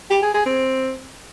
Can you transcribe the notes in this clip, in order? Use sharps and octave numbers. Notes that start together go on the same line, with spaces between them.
G4
G#4
G#4
C4